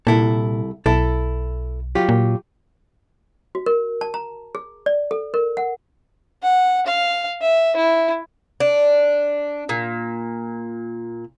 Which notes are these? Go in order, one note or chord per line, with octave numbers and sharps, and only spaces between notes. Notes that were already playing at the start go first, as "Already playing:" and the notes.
C2 A#2 E4 A4
B1 E4 A4
F#3 F4 G4
A#2
F#4
A#4
A5
A#5
G#4
D5
A4
A#4
F#5
F#5
F5
E5
E4
D4
A#2